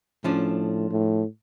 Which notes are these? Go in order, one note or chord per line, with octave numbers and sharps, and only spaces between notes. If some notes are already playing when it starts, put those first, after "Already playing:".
A2 F3 C#4 D4
A2